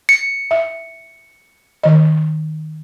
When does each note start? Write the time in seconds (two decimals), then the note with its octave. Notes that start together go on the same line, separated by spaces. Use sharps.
0.09 C#7
0.51 E5
1.83 D#3 D#5